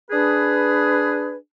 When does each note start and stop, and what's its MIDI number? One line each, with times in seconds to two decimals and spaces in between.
0.11 1.35 62
0.11 1.35 68
0.11 1.35 71